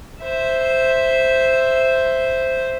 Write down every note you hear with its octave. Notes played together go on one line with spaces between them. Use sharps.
C5 E5